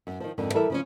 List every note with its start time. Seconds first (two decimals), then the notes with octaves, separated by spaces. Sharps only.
0.07 F#2
0.20 D#3 F3
0.38 F2 G#2 D3 D#3
0.54 E3 G3 A4 A#4 E5
0.70 C#3 F3 C#4